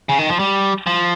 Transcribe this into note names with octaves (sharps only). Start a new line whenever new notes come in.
C#3
D#3
F3
G3
F3